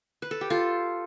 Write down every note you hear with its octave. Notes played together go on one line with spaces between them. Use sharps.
B4
A4
G4
F4 A4